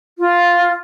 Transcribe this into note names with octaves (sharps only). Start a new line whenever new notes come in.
F4